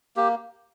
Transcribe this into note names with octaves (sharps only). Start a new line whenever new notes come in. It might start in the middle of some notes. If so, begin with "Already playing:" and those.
A#3 G4